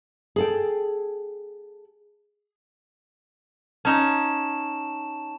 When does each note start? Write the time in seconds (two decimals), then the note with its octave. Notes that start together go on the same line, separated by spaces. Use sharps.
0.36 G#4 A4 G5
3.85 C#4 D#4 A5 E7